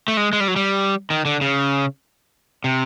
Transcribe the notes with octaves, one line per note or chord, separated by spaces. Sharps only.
A3
G#3
G#3
G3
F#3
G3
D#3
D3
C#3
C3